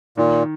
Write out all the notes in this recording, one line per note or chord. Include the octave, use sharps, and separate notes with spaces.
A#2 D#3